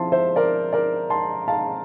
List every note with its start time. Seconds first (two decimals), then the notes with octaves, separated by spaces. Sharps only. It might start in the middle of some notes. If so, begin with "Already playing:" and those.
Already playing: F3 C4 E4 A5 C6
0.12 C5 E5
0.36 A#4 D5
0.73 A#4 D5
1.10 A5 C6
1.48 F5 A5